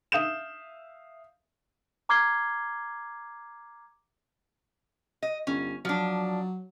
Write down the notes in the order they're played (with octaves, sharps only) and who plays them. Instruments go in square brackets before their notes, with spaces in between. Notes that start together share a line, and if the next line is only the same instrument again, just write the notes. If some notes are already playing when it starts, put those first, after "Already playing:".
[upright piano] E5 F5 D#6 G6 E7
[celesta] A#5 D6 F6 G#6 C7 G7
[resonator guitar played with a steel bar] D#5
[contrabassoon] G1 [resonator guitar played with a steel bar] C#4
[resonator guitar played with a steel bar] F3 D4 [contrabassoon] F#3